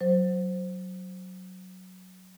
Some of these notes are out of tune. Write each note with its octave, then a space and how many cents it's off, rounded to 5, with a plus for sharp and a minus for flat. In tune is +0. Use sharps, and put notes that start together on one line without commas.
F#3 +0 C5 +0